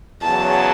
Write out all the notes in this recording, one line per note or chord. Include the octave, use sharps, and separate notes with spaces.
E2 C#3 F#3 A5